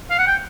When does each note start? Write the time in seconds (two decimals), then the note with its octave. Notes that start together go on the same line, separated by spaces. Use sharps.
0.10 F5
0.19 F#5
0.27 G5